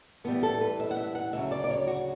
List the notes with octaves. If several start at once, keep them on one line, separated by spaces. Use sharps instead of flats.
A2 E3 G3 B3
A4
B4
E5
F#5
E5
F#5
D2 C#3 F#3 E5
D5
D5
C#5
F#4